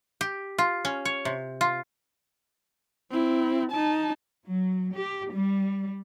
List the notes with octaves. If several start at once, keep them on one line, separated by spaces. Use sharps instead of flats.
G4
F4
C#4
C#5
C3
F4
C4 E4
D#4 A5
F#3
G4
G3